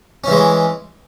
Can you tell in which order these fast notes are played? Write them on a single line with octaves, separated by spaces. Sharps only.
C#4 E3 G#3